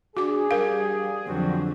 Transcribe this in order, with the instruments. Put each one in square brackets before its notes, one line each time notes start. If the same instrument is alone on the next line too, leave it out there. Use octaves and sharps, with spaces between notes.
[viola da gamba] D4 [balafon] F#4 D6 [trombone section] G#4
[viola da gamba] G3 [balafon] A#4 F5
[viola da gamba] F2 D3 F#3 [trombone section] C4 D4 F#4